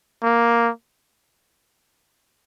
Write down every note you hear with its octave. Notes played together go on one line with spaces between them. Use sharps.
A#3